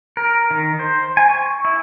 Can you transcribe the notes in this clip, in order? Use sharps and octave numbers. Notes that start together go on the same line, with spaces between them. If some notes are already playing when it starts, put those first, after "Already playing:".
A#4
D#3
C5
G#5
C#6
E4